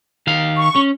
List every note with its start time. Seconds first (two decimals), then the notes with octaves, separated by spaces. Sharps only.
0.27 D#3 F5
0.57 C#6
0.76 C#4